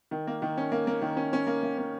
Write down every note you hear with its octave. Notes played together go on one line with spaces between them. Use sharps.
D#3
A#3
D#3
C#4
A#3
A#3
D#3
C#4
C#4
A#3
A#3
C#4